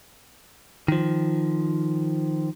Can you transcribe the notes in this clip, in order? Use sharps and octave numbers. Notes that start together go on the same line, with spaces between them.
D#3 F3